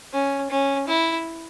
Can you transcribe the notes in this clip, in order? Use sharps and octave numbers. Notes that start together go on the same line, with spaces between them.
C#4
C#4
E4